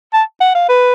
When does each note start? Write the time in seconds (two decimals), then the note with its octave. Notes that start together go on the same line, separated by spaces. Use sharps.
0.13 A5
0.41 F#5
0.55 F5
0.69 B4